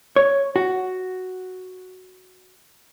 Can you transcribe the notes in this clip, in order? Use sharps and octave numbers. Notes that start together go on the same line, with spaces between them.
C#5
F#4